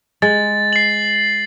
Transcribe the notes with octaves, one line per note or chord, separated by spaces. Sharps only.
G#3 A6
C7 F#7